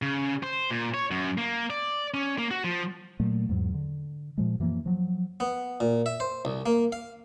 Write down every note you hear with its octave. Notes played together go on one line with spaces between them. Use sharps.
C#3
C5
A#2
C#5
F#2
A#3
D5
C#4
A#3
F#4
F3
A#2 F#3 A3
E2 G#2 F#3
D3
A#2 F3 G#3
F#2 E3 F3 A#3
F3 F#3
B3
A#2
E5
C5
C2
A#3
F5